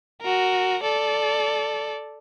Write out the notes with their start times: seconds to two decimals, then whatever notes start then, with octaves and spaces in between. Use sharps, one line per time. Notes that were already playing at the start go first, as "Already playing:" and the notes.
0.22 F#4 A#4
0.83 A4 D5